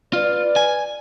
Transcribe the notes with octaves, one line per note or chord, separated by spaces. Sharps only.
F4 B4 D5
G#5